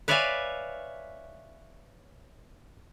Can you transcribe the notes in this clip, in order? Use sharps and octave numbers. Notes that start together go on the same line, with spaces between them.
B4 C#5 D5 E5 F5 G#5